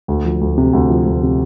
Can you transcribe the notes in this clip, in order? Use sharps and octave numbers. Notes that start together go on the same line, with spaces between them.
D2
F3
D2
C3
D2
F3
D2
C3